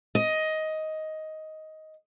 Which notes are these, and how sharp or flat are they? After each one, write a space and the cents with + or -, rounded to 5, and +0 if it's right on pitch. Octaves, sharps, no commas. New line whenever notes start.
D#5 +10